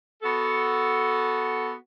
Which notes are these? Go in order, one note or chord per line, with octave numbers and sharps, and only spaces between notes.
B3 F#4 A4